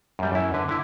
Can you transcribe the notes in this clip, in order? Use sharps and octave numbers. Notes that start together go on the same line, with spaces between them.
F#2 G3
F#2 E4
D3 B4
D3 E4